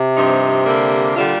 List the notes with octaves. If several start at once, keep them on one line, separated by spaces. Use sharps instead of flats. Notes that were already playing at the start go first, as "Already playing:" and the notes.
Already playing: C3
G2 F3 C4 D#4
D3 G3 A#3
A#2 D3 G3 D4 F4